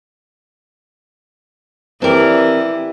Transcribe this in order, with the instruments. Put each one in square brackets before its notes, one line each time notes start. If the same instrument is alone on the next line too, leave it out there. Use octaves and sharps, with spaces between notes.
[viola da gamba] E3 [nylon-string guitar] C4 A#4 [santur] D4 G4